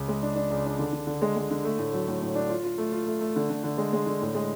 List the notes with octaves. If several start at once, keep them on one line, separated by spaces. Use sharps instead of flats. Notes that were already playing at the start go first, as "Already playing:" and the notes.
Already playing: C#2
G#3
D4
D4
C#2
D4
D3
D3
D3
G#3
G#3
D3
A3
A2
F#3
A2
A2
D4
F4
F4
A3
F4
A3
A3
D3
D3
D3
G#3
G#3
D3
A2
G#3